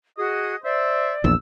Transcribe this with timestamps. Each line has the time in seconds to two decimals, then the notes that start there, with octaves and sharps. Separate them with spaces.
0.18 F#4 G#4 D#5 D#6
0.64 C5 D5 E5
1.24 A#1 E2 E6